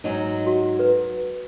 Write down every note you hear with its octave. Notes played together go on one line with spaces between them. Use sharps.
G#2 F#3 D#4
F#4
B4